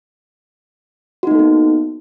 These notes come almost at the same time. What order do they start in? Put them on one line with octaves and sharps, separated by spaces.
F#4 D#4 A#3 A4 B3